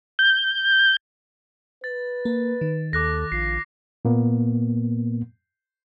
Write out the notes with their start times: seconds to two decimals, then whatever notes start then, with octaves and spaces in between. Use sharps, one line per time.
0.19 G6
1.84 B4 A6
2.25 A#3
2.61 D#3
2.93 D#2 A4 D6 F#6 A#6
3.32 A#1 F4 C7
4.05 A#2 A#3 B3